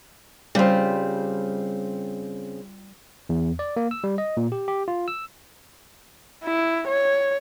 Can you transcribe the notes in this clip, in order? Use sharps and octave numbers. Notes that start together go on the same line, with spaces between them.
C#3 G3 C4 F4
E2
D5
A#3
E6
G3
D#5
A#2
G4
G4
F4
E6
E4
C#5